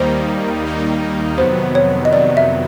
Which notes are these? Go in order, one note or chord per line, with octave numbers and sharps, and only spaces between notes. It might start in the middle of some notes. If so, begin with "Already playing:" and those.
Already playing: D#2 D#3 G3 A#3 D#4 C5
D#2 D#3 G3 A#3 D#4
F2 C3 D#3 F#3 B3 C5
C#5
D#5
F2 C3 D#3 F#3 B3 D5
E5